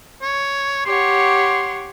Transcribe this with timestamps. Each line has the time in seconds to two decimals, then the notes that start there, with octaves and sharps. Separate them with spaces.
0.22 C#5
0.86 G4 C#5 F#5 C6